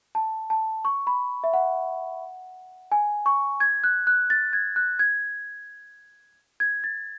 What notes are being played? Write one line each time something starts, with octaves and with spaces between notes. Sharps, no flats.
A5
A5
C#6
B5
E5
F#5
G#5
C#6
G#6
F#6
F#6
A6
G#6
F#6
G#6
G#6
A6